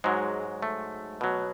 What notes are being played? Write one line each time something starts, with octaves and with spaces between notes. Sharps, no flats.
G#2 F#3 G#3
A3
B2 F#3